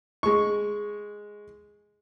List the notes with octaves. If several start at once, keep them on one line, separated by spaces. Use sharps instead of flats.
G#3 C#6